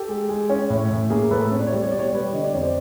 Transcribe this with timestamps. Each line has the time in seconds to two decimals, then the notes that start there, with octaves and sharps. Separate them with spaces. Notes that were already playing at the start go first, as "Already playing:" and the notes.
Already playing: G4 A4
0.08 G#3
0.29 G#3
0.50 C#4
0.70 A2
0.91 A2
1.10 A#3 G#4 A#4
1.31 A2 A4 B4
1.51 C4 C#5
1.59 D5
1.67 C#5
1.72 G3 D5
1.84 C#5
1.91 B2 D5
1.99 C#5
2.06 D5
2.13 G3 B4 C#5
2.33 D3 D#5
2.43 D5
2.54 F2 C#5
2.63 C5 D5